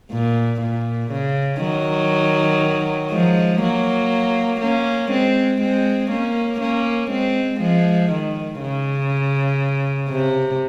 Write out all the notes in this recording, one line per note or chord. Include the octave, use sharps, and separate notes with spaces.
A#2
A#2
C#3
D#3 F#3
F3 G#3
F#3 A#3
A#3 C#4
G#3 C4
G#3 C4
A#3 C#4
A#3 C#4
G#3 C4
F3 G#3
D#3
C#3
C3